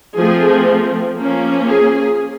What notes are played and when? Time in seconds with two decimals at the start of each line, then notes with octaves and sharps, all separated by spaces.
0.17 F3 A3 C4 G#4
1.16 F3 A#3 C#4
1.67 G#4